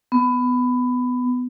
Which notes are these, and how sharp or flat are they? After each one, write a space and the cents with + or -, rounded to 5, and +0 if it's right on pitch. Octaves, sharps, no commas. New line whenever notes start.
B3 +15